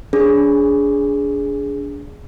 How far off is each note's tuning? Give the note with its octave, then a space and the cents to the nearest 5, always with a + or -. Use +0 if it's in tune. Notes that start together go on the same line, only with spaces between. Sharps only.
D4 -30 G#4 +0